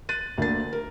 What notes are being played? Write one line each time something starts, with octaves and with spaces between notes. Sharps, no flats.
F#6 A6 D#7
D2 A#3 D4 A6
A#4